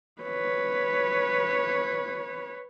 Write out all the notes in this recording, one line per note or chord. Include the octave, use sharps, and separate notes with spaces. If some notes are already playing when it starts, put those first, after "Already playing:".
B4 C#5